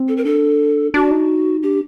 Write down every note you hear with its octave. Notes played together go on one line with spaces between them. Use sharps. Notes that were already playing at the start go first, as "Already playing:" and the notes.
Already playing: C4
A4
A#4
D4 A4
D4 F#4
D#4
D4 G4